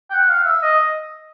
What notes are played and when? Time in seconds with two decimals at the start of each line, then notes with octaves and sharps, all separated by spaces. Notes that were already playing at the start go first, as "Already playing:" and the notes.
0.10 G5
0.13 F#5
0.29 F5
0.45 E5
0.62 D#5